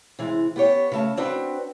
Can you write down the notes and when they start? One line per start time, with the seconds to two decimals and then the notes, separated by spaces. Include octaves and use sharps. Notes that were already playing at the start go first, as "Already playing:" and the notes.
0.19 C3 E3 G#3
0.56 B3 G4 C#5
0.92 C#3 A3 A5
1.17 C4 D4 F#4 B4